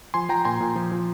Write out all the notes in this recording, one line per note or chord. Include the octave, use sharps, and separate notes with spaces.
F3 G#5 C6
F3 G5 A#5
A#2 G#5 C6
A#2
F3
F3